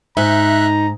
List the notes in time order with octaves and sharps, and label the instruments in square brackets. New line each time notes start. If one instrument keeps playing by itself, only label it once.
[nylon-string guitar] G#2 [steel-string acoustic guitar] D#4 [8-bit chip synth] E5 F#6 [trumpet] A#5